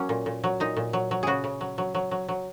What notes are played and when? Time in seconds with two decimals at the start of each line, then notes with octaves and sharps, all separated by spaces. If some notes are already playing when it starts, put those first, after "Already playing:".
Already playing: F#3 A#3 C#4
0.09 A#2
0.26 A#2
0.44 F#3
0.60 A#2 D#4
0.77 A#2
0.93 F#3
1.11 F#3
1.23 C#3 F#4 G#4
1.44 C#3
1.61 F#3
1.78 F#3
1.95 F#3
2.11 F#3
2.28 F#3